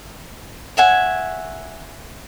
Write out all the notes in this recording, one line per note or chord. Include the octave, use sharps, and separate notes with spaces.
C#5 E5 F#5 G#5